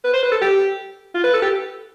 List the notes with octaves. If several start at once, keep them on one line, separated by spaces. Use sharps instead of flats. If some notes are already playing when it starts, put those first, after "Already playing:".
B4
C5
B4
A4
G4
F4
B4
A4
G4